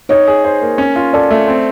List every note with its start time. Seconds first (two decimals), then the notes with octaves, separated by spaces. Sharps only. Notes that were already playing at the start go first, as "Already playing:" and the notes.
0.09 D#4 C#5
0.28 G#4
0.44 C5
0.62 A#3
0.78 C#4
0.96 F4
1.13 A4 D5
1.30 A3
1.48 C4